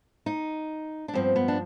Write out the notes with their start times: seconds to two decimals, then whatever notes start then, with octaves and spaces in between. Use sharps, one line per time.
0.26 D#4
1.08 D4
1.14 G2 F3 B3 C4
1.36 B3
1.48 D4